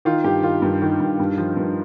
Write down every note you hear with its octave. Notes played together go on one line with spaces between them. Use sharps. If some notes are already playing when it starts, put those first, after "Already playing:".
D#3 F4
G2 G4
D#3 F4
G2
D#3
G2
G2
F3
G2